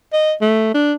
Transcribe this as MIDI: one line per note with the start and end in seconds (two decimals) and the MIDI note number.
0.13 0.33 75
0.41 0.74 57
0.74 0.93 62